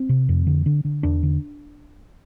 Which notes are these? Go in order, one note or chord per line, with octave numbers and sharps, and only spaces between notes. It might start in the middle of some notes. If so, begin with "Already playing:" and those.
Already playing: C4
C3
F2
D3
D3
D3
E2 D4
D3